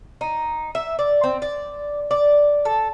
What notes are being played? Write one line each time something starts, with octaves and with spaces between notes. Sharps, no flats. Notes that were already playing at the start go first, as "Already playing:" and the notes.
D#4
E5
D5
C4
D5
D5
A4